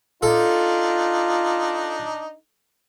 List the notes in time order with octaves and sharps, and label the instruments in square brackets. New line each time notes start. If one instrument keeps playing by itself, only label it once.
[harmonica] D4 D#4 [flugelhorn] F4 [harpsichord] A4